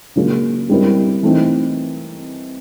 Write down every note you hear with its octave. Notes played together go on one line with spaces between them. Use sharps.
C#3 F#3 A#3 C#4 F4
G3 C4 E4 G4 A#4
E3 A3 C4 D#4